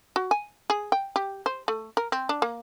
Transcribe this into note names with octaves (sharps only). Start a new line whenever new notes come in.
F#4
G#5
G#4
G5
G4
C5
A3
A#4
C4
D4
A#3